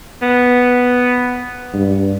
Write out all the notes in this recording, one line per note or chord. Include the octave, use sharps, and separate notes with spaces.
B3
G2